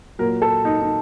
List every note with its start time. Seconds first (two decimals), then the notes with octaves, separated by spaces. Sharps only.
0.19 A#2 F#3 A#4
0.42 A4
0.65 D#4
0.81 D#4